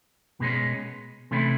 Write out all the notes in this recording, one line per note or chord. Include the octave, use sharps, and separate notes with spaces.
B2 G#3 C#4
C3 E3 A3 C#4 E4